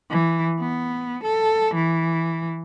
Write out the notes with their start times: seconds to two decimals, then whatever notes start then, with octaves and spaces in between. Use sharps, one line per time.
0.10 E3
0.60 B3
1.24 A4
1.75 E3